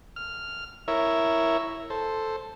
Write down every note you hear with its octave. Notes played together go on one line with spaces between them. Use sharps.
F6
E4 A#4 C#5 E5
A4 C5